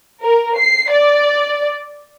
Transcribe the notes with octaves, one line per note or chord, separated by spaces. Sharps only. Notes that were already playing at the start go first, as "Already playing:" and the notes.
A#4
C7
D5